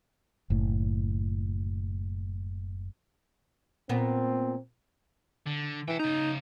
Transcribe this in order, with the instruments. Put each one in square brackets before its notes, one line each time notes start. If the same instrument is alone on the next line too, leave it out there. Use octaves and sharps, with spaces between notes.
[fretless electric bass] F#1 A2
[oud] A#2 B3 [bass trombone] C4
[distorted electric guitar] D3
[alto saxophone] E3 [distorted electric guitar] E5 G5
[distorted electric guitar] C#3 A#5 [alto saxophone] D#4